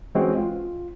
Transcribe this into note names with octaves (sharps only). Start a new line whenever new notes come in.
E3 G#3 C4 C#4 F#4
F4